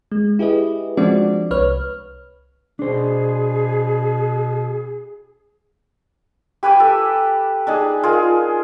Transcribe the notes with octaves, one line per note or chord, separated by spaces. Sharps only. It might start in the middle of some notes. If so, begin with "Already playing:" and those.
G#3
E4 G4 G#4 B4 D#5
F3 G#3 C4 D4 F#4 D5
C2 B4 C#5 F6
B2 D4 G#4 C5
G4 B4 G#5 D6
A4
D4 D#4 G#4
F4 G#4 A#4